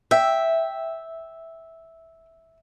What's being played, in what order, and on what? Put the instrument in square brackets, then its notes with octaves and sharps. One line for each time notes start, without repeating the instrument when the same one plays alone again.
[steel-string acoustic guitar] E5 [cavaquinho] G5